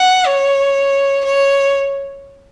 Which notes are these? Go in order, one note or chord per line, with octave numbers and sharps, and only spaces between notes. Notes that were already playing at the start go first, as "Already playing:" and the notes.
Already playing: F#5
C#5
C#5